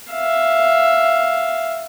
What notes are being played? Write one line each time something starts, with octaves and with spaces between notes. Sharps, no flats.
E5 F5